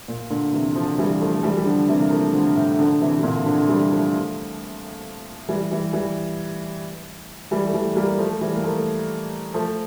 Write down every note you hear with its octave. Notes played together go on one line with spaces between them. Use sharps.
A#2
A#2 D3
C3 E3
D3 F3
F3
E3 G3
F3 A3
A3
E3 G3
G3
D3 F3
C3 E3
A#3
F3 A3
D3 F3
A2
D3 F3
C3 E3
C3
A#2 D3
D3 F3
E3 G3
F3 A3
E3 G3
E3 G3
E3 G3
E3 G3
A3
E3 G3
G3 A#3
F3 A3
E3 G3
A#3
F3 A3
F3 A3